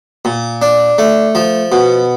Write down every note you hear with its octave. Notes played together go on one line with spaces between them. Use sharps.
A#2
D4
A3
F3
B2